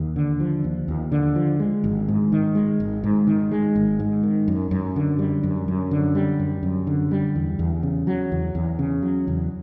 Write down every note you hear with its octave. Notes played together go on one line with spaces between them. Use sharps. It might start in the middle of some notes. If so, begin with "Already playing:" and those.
Already playing: D#2
D3
F3
D#2
D#2
D3
F3
G#3
G#1
G#2
D#3
G#3
G#1
G#2
D#3
G#3
G#1
G#2
D#3
F#2
F#2
D3
G3
F#2
F#2
D3
G3
F#2
F#2
D3
G3
E2
E2
C#3
F#3
E2
E2
C#3
F#3
E2